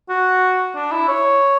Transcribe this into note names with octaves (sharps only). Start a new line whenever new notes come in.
F#4
D4
E4
C#5